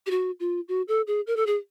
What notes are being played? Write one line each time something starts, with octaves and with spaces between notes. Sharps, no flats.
G4
F#4
F4
F#4
A4
G#4
A#4
A4
G#4